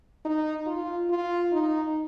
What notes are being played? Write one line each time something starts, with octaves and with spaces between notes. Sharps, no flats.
D#4
F4
F4
D#4